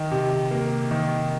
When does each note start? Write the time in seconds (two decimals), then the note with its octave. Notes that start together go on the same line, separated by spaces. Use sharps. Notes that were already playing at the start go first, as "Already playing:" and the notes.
Already playing: D#3
0.11 C3
0.51 A#3
0.91 D#3